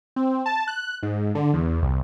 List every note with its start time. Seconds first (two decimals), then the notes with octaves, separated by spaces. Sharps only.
0.16 C4
0.46 A5
0.67 F#6
1.03 G#2
1.35 D3
1.54 E2
1.83 C2